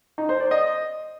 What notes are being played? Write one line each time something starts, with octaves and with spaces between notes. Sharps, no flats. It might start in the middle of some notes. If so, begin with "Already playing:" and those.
D#4
C5
D5
D#5